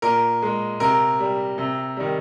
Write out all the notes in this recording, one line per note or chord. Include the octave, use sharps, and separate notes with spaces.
A#2 A#4
G#3
C3 A#4
G3
C3
D#3 G3